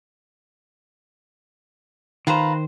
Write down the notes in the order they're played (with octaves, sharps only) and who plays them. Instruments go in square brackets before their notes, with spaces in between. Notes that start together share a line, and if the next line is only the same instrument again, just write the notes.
[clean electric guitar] D#3 C5 [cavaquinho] F4 B4 A#5